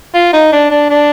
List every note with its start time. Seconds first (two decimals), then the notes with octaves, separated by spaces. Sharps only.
0.14 F4
0.33 D#4
0.52 D4
0.71 D4
0.90 D4